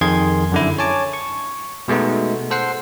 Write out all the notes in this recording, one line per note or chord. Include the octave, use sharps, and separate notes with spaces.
F2 D#3 G#4 C6 G#6
F#2 D3 E4
C#5 G#5 A5 D6
C#6
B2 G#3 A3 B3 D#4
A4 C5 F#5 C7